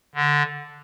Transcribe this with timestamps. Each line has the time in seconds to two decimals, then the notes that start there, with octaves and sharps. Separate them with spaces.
0.15 D3